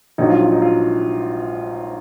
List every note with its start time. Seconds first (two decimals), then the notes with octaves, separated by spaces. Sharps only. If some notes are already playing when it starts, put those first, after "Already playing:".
0.18 A#1 G#2 F#3 D#4
0.30 F4
0.41 F4
0.52 D#4
0.62 F4